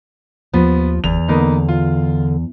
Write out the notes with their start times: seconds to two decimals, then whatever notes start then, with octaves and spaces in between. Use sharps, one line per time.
0.54 D#2 F3 B3
1.04 G1 E2 F7
1.28 D3 A#3 B3 D#4
1.69 F4